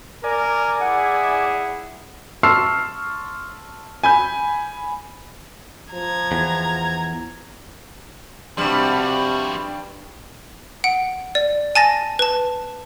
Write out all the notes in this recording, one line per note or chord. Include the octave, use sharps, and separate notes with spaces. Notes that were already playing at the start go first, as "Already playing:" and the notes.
A#4 D5 G#5
E4 G#4 F#5
A5 C6 C#6 E6 F6 C7
G#5 B5 G6
F3 A#5 G#6
E2
G2 C3 F3 G3 F#4
F#5 D7
D5
G#5 A5 A6 A#6
B4 A5